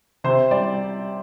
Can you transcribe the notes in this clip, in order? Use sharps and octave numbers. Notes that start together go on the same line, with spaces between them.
C3 C5
G3 D5